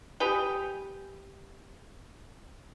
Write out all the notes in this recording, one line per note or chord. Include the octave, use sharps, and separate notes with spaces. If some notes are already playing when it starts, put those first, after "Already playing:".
G4 G#4 B4 G5